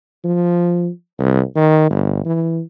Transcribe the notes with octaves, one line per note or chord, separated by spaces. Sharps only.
F3
C2
D#3
G1
E3